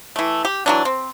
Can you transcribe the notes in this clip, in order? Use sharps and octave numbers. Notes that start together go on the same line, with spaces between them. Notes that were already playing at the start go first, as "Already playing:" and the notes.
E3 A3
G4
E3 F#3 D4
C4